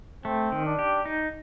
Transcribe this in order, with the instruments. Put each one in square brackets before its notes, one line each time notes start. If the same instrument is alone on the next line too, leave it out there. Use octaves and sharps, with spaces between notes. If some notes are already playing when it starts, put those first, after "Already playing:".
[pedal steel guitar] A3 [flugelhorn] C4
[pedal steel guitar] D#3
[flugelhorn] D4
[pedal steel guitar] G4
D#4